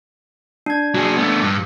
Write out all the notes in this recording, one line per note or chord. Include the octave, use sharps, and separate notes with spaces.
D4 G#6
F#3 G#4
A3 B3
G2